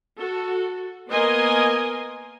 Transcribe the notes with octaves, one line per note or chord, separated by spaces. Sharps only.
F#4 A4
A#3 B3 A#4 D#5 G#5 C6